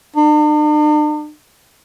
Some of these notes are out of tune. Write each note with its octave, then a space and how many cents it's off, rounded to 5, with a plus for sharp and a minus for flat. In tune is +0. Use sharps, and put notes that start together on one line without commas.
D4 +45